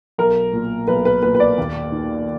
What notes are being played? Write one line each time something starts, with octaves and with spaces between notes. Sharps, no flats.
B1 A#4
A#2
B1 B4
B4
A#2 B4
B4
D5
D#2
D#3